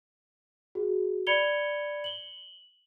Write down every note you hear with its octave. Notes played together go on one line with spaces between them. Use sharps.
F#4 G#4
D5 B5 G#6 C#7 F7 G7
F#7 G7